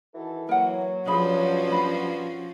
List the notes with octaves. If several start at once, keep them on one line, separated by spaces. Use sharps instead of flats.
D#3 E3 F#4 A4
F#3 A#3 A#4 F#5
G2 F3 C#4 F#4 G#4 B5
D4 B5